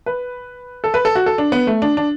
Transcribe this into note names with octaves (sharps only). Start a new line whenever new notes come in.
B4
A4
B4
A4
F#4
A4
D4
B3
A3
D4
D4